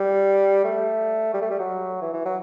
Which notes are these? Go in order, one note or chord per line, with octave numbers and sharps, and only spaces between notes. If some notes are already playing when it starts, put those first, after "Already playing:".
Already playing: G3
A3
G3
A3
G3
F#3
E3
E3
F#3